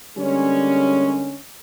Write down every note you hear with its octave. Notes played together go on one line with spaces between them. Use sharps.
D3 G3 G#3 A#3 C#4